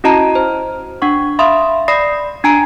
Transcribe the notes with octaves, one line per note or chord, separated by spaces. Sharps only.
C#4 E4 F#4 D#5 A5 A#5
C5
D4 F#5 C#6
E5 F5 B5 C6 D#6
D5 B5 D#6 A#6 C7
D4 G#5 A#5 D7